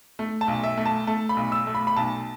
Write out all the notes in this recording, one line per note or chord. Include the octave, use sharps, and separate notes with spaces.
A3
A5
B1
E5
A3
A5
A3 A5
B5
B1
E6
A3
B5
B5
B1 A5